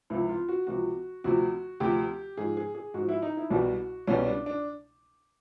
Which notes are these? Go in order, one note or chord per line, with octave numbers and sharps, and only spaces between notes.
C#2 C3 F3 E4
F4
F#4
C#2 C3 F3 F#4
D2 C3 F3 F#4
D2 C3 F3 G4
G#2 F3 G#4
G#4
G#4
G#2 F3 F#4
E4
D#4
E4
C2 B2 G3 F#4
C2 B2 G3 C#4
D4
D4